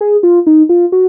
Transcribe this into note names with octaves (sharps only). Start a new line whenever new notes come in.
G#4
F4
D#4
F4
F#4